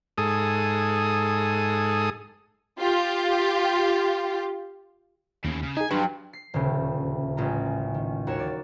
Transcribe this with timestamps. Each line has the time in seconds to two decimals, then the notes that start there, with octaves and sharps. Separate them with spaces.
0.18 G#2 G#4 A4 D#6
2.80 F4 G4
5.45 D#2 A2 C#3
5.63 C#3
5.77 D#4 G#4 G#5
5.91 G2 F#3 B4 C6
6.33 C7
6.54 D#1 D2 C#3 G4
7.37 A1 G#3 F4 A#5
7.94 D#3
8.27 D#2 F#4 A#4 C#5 E7
8.39 D5